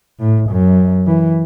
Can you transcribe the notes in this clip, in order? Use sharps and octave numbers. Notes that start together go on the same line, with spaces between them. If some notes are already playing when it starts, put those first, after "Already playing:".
A2
F#2
E3